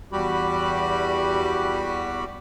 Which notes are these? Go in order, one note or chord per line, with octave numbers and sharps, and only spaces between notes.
E2 G3 F#4 G4 B5